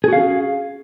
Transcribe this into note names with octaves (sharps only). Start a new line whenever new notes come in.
C#4 F#4 G#4 F5